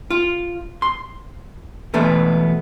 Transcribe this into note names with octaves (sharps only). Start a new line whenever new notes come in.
F4
C6
E2 B2 A3 B3